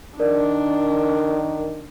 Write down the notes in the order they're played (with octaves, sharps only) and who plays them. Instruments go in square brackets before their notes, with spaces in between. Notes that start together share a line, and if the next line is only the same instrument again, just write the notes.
[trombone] D#3 [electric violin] D4 [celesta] A#4 D5